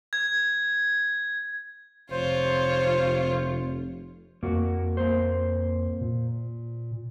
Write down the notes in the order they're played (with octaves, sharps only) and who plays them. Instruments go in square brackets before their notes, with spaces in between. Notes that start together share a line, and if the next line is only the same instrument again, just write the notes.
[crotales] G#6
[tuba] F1 [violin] F4 C#5 [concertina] C5
[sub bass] F2 [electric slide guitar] A#3 F#4
[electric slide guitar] A#3 C5
[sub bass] A#2